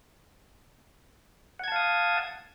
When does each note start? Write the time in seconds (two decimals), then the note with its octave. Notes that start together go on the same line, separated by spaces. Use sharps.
1.59 F#5
1.64 G#6
1.68 A5
1.72 F5
1.76 D#6